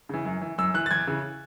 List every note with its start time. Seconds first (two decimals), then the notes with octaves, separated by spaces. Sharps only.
0.09 C#3 E3
0.25 F#2
0.42 E3
0.58 F#2 E6
0.74 E3 F#6
0.86 A6
0.91 E2 G#6
1.07 C#3 E3